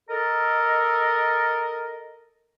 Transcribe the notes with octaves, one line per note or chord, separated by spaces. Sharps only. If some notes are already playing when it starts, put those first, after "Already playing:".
A4 A#4 D#5